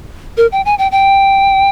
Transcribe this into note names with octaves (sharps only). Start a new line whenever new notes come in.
A#4
G5
G#5
G5
G5